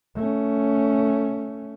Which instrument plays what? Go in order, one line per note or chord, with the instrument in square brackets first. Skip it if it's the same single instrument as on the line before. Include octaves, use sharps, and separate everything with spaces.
[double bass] A3 C#4